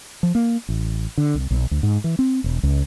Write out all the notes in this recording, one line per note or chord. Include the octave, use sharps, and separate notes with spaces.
F3
A#3
A1
D3
C2
B1
D2
G#2
E3
C4
E1
C#2